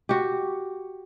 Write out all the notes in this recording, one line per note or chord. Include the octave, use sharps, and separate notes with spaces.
F#4 G4